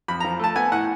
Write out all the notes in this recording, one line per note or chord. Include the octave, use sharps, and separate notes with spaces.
F2 B5
A#5
F3
A3 A5
B3 G#5
A2 F#5